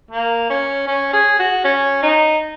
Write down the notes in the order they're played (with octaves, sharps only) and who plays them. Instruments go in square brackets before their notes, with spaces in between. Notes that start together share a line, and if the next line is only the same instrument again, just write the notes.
[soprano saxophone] A#3
C#4
C#4
G#4
F#4
C#4
D#4